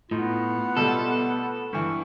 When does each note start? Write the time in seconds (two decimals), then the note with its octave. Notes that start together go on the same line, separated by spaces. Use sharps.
0.11 A2 B3 D#4 F4
0.77 B2 G3 A3 A4
1.73 G2 E3 C#6